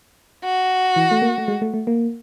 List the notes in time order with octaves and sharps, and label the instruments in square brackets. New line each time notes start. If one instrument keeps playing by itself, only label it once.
[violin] F#4
[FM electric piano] E3
A3
A#3
A3
G#3
A3
A3
A#3